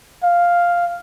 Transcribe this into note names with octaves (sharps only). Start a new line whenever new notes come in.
F5